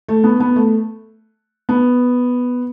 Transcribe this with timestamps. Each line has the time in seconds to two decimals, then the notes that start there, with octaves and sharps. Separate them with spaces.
0.08 A3
0.24 B3
0.40 B3
0.56 A3
1.69 B3